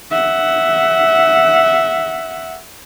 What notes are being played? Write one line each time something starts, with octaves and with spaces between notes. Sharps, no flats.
E5 F#5